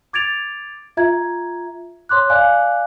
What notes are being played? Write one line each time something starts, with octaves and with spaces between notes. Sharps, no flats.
D6 G#6 A6 D7 F7
F4 E5 A#5 G#6
C#5 C6 D6 F#6
D5 F5 G#5 D6 F#6